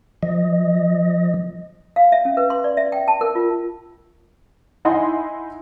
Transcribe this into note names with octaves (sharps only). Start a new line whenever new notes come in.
F3 D#5
F5
E5
C#4
B4
C6
D5
E5
G5
A5
A#4
F4
D#4 E4 D#5 F#5 G#5 C6